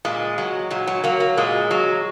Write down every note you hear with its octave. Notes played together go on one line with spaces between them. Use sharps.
A#2 G#3
F#3
A#2 F#3
F#3
F#3 A#3
A#3
A#2 G#3
F#3